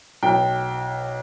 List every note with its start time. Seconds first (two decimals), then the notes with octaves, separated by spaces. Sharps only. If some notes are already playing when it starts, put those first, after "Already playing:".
0.23 B1 G5